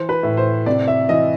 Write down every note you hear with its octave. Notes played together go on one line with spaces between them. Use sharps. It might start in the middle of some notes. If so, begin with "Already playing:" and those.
Already playing: E3 C5
B4
A2
C5
C3 D5
E5
E3 D#5